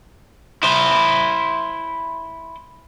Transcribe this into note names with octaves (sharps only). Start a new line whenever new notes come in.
E4 C5